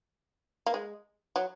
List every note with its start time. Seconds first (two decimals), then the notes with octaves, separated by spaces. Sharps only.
0.66 A#3
0.74 G#3
1.36 F#3